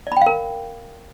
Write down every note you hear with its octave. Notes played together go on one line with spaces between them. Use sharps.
A#4 D5 F5 G5 B5